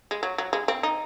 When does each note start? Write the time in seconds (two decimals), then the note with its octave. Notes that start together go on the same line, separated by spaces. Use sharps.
0.11 G#3
0.23 F#3
0.38 F#3
0.53 G#3
0.68 C4
0.83 D#4